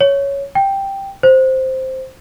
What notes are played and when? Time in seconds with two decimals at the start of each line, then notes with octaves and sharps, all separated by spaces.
0.01 C#5
0.55 G5
1.23 C5